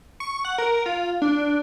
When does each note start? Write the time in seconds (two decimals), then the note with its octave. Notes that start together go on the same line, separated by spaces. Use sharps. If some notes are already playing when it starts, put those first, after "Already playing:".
0.20 C#6
0.45 F#5
0.58 A#4
0.86 F4
1.22 D4